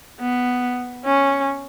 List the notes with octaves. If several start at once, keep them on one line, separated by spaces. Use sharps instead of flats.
B3
C#4